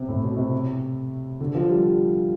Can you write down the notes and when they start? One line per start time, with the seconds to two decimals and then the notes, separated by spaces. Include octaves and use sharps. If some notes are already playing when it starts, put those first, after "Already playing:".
Already playing: C3
0.08 A2
0.24 B2
0.37 C3
1.41 D3
1.55 F3
1.69 G3